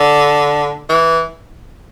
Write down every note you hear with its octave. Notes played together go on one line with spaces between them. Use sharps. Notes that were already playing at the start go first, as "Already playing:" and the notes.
Already playing: D3
E3